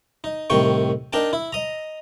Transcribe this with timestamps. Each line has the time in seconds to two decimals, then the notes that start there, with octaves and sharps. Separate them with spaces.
0.24 D#4
0.50 C2 A2 D#3 G5 C#6
1.13 D4 D#4 A#4 G5 A5
1.33 E4
1.52 D#5 A#5